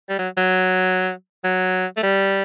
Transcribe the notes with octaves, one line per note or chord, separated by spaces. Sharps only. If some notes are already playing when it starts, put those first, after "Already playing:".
G3
F#3
F#3
F#3
A3
G3